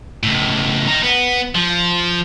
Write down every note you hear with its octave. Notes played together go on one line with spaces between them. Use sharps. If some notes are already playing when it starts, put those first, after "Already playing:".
C#2 A2
D#4 A#4
B3
F3